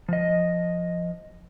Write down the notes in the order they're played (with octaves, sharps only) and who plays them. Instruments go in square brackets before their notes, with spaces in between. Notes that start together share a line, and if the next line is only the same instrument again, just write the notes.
[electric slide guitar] F3 D#5